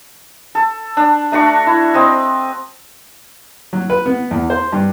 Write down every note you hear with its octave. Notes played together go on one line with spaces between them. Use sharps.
A4
D4
A3 D4 F#4 C#6
E4
C4 D#5 E6
F#3
B4
B3
E2
C5
G2